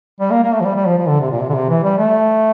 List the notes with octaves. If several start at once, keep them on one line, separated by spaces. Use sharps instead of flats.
G3
A#3
A#3
A3
F3
G3
G3
F3
F3
D3
C3
A#2
C3
D3
C3
E3
G3
A3